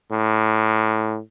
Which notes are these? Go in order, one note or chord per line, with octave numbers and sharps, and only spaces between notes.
A2